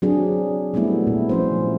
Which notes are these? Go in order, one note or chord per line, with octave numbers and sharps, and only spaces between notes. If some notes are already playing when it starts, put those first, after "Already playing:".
F#3 C4 D4 G#4
F#3 G3 A3 B3 E4
A#2
F3 C#4 C5